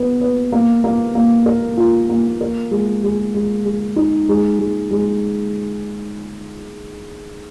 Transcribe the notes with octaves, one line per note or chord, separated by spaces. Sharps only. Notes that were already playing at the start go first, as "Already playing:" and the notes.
Already playing: B3 B4
B4
A#3
A#3
A#3
A#4
F4
A#3
A#4
G#3
G#3
G#3
G#3
D#4
G#3
G#3
G#3